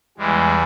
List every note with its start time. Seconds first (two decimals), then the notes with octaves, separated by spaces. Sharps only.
0.18 E2 E3 G3 G#3